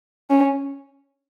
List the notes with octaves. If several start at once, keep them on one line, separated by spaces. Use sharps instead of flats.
C#4